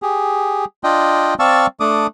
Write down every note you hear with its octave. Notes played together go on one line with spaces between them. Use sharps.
G4 G#4
D4 F4 D#5 G5
C4 D5 F5 A5 C#6 E6
A3 D4 D6 D#6